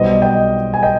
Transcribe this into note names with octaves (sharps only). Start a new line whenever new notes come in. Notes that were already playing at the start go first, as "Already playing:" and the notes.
Already playing: B1 B2 G3 C5 D#5
D#5 G5
G#5
D#5 G5